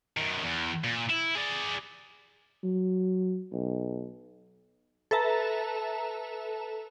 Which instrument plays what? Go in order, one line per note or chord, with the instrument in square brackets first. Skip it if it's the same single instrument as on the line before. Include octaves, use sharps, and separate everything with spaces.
[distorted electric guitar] F#2 D#3
E2
A#2
E4
G#4 D5
[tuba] F#3
B1
[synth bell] A4 B4 E5 A5 A#5